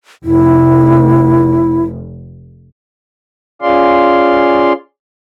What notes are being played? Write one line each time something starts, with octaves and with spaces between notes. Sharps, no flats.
F1 E4
C#4 F4 G#4 D5 F5 C6